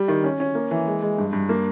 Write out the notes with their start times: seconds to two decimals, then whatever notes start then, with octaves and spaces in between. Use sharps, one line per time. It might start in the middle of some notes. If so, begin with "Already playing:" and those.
Already playing: G3
0.08 D#3
0.24 C#4
0.40 C#4
0.55 A#3
0.71 E3
0.87 G#3
1.03 G#3
1.18 G2
1.33 G2
1.49 A#3